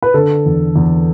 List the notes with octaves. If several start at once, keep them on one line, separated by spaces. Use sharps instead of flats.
B4
D3 A4
E2
E2